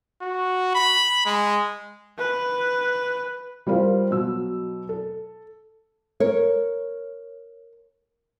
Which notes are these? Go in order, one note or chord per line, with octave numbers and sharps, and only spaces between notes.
F#4
B5
G#3
B4
G3 F4 A#4 C5 F5
B2 F#3 E6
A4
A#4 C#5